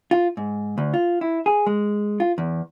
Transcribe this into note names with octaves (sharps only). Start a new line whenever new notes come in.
F4
G#2
D2
F4
E4
G#4
G#3
F4
E2